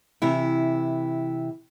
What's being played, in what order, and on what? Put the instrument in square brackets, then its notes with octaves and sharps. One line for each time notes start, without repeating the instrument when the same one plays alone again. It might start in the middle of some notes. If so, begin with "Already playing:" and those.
[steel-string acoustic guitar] C3 E3 E4